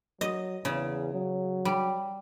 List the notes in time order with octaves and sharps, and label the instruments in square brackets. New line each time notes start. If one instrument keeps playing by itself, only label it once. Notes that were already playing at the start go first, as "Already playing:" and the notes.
[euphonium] F#3 [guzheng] D#5
[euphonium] E2 [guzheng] C#3
[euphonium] F#3
[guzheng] G3